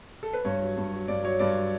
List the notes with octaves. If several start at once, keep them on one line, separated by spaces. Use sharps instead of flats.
A4
B4
G2 C#5
F#3
G2
F#3
G2 D5
F#3 C#5
G2 D5
F#3